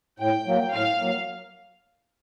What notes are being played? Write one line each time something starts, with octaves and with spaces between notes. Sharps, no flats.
A2 G5
F#3 A#3
A2 F5
F#3 A#3